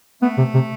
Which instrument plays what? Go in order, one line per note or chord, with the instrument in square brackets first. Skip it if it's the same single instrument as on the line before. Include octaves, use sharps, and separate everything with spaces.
[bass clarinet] A3 [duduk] B3
[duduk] C3
C3